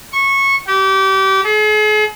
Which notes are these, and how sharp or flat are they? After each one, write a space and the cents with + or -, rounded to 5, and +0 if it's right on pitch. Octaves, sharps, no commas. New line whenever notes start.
C#6 -15
G4 -30
G#4 +45